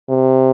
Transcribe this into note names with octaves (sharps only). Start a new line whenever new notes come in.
C3